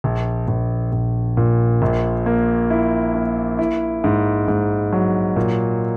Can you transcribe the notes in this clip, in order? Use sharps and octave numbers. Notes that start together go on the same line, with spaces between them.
A#1
A#1
A#1
A#2
A#1
A#3
E4
A#3
E4
G#2
G#2
F#3
A#2